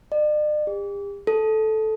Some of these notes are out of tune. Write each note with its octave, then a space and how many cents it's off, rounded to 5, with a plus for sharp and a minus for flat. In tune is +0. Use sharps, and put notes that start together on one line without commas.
D5 +45
G4 +45
A4 -10